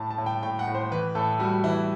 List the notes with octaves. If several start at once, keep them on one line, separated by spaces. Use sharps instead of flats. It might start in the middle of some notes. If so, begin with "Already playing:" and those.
Already playing: A2 A5
A5
A2
G5
A2 G5
F#5
A2
C5
E3 B4
A2 A4
G3 F#4
E3 E4